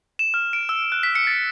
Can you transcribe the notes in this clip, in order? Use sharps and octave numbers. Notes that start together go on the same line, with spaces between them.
E7
F6
D7
E6
F#6
B6
C#7
A6